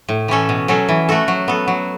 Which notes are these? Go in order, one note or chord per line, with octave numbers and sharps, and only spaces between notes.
A2
E3 C#4 A4
B2
F#3 C#4 A4
E3
A3 F#4 A4
F#3
B3 A4
F#3